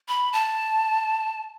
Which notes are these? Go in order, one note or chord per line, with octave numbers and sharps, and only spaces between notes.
B5
A5